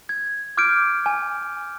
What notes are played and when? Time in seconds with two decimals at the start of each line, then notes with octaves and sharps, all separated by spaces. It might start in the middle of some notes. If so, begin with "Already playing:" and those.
0.09 G#6
0.57 D6 F6 G6 G#6 D7
1.06 G#5